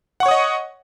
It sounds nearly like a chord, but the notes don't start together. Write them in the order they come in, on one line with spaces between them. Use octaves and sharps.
F#5 C#6 C#5 D#6 D#5